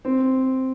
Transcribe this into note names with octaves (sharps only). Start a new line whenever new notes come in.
C4